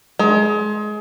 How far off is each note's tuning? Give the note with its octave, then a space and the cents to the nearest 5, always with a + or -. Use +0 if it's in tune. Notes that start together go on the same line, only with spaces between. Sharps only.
G#3 +25